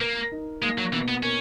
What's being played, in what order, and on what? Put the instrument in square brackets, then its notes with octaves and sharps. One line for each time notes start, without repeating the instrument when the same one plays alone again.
[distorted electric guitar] A#3 [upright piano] A#4
[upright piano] D#4
[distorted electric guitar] G#3 [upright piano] A#3
[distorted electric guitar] F#3
[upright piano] B2 [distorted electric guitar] E3
[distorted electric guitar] B3
[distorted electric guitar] C#4 [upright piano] A#4